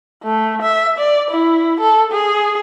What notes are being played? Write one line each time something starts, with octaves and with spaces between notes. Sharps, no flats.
A3
E5
D5
E4
A4
G#4